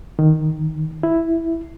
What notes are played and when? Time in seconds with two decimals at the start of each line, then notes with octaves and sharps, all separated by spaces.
0.19 D#3
1.03 E4